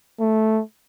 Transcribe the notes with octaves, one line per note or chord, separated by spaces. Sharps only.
A3